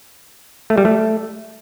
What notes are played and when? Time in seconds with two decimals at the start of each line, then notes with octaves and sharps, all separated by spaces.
0.70 A3
0.78 G3
0.85 A3